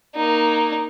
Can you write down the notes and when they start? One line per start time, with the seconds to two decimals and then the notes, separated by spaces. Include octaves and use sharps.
0.15 A#3 D#4